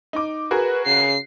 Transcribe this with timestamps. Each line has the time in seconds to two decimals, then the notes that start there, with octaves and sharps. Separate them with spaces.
0.13 D#4 D6
0.51 F#4 G#4 A#4 B4
0.86 C#3 C7